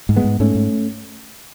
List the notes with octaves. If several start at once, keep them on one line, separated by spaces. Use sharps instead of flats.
G#2
G#3 B3
G#2
G#2 A3 C#4
G#2